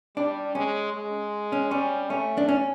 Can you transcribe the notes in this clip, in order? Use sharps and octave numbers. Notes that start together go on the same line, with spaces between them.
G3 D4
G#3 C#4
G#3
C#4
G3 C#4
A3 C#4
D4
C#4